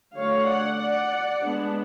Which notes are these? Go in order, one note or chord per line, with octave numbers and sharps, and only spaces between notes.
D3 F#3 A3 C#5 F5
D5 F#5
D5 F#5
G#3 B3 D4